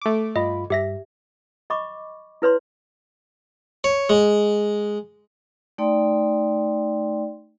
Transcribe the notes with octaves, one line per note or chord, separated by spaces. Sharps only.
A3 D6
G2 F4 D#5 B5
G2 G4 E5 A#6
D#5 B5 C#6 D6
E4 B4 C#5 C6
C#5
G#3
A3 D#4 D5 G5 C6